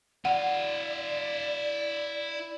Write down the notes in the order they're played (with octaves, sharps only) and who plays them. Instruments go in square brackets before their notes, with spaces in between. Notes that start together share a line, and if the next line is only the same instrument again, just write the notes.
[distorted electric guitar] E4 F5 [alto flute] D5 [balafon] F#5